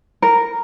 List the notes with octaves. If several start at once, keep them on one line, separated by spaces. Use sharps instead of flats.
A#4